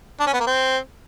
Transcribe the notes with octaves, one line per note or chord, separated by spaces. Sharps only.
D4
C#4
B3
A#3
C4